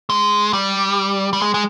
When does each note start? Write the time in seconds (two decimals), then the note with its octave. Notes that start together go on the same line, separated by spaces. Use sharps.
0.10 G#3
0.53 G3
1.33 G3
1.42 G#3
1.54 G#3